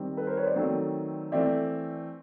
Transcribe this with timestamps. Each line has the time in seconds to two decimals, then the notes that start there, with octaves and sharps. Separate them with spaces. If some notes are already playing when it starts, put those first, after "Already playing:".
Already playing: D#3 G3 C4
0.17 A4 B4
0.27 A#4 C5
0.37 B4 C#5
0.46 C5 D5
0.56 D#3 F#3 A3 C4
1.32 E3 A3 C4 D5 E5